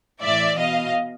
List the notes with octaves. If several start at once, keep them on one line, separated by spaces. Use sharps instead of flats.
A2 E3 D5 E5
B2 D#5 F5